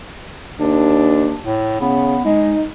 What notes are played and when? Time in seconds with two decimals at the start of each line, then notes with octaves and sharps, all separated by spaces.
0.59 D#2 D4
1.43 A2
1.81 C#3 B3
2.25 G#3 D#4